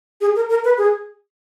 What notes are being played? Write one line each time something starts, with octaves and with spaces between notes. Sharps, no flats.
G#4
A#4
A#4
B4
G#4